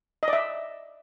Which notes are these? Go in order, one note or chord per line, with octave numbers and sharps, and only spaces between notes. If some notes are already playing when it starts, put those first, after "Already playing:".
D#5
D5
E5